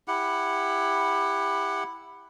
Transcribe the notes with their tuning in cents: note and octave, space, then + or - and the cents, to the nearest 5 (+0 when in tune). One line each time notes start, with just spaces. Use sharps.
E4 +0 G4 +20 F#5 +0